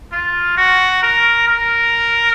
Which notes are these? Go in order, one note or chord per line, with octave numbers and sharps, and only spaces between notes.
F4
F#4
A#4
A#4